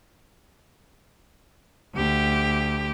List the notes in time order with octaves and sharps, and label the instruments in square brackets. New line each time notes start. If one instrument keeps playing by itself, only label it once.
[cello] D2 G4